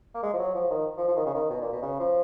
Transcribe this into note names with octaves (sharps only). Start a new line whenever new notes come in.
A#3
G#3
F3
F#3
F3
D#3
F3
F3
D#3
C#3
D#3
B2
A#2
B2
C#3
F3